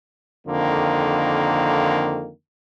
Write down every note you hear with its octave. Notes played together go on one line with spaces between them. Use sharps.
F2 D3 D#3 A#3